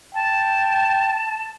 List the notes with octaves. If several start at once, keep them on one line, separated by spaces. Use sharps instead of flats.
G5 A5